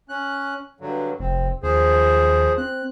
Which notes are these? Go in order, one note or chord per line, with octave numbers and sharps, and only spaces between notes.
C#4 F#6
G2 D3 F#3
F1 C4
D#2 F3 G#4 C5
C4 F#6